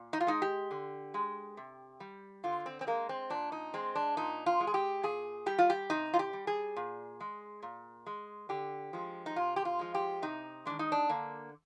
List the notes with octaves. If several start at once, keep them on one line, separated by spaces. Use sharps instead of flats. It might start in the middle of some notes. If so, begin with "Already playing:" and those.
Already playing: A#2
D#4
F4
G#3 D#4
G4
D3
G#3
C3
G3
D3 F4
C4
C4
G#3 A#3
C4
A#2 D4
D#4
G#3 C4
D4
A#2 D#4
F4
G#3
G#4
G4
A#2 G#4
G3 G4
F4
G4
C3 D#4
F4
G4
G3
G#4
A#2
G#3
A#2
G#3
D3 G4
F3 G#3
D#4
C3 F4
G4
F4
F3 G#3
G4
C3 D#4
D#3 G#3 D4
D#4
D4
D3 A#3